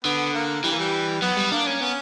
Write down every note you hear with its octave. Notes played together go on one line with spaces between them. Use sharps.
D3 B3
A#3
E3 G3
A#3
G3
F#3 B3
G3
A#3 D4
C#4
B3 C#4